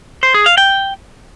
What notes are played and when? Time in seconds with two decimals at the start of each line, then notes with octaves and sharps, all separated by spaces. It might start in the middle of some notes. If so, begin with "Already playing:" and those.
0.23 C5
0.34 G#4
0.46 F5
0.58 G5